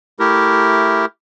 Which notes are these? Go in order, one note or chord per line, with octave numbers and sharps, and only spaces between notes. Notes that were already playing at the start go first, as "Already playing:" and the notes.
A3 E4 G4 A#4